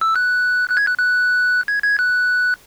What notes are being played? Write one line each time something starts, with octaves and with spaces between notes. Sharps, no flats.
E6
F#6
F#6
G#6
F#6
F#6
G#6
G#6
F#6